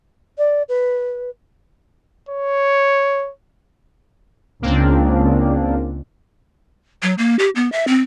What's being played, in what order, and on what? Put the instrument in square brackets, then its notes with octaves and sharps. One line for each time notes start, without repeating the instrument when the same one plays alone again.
[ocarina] D5
B4
[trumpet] C#5
[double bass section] C#2 [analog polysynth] A#3 C4 D4
[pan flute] F#3
A#3
G4
B3
E5
C4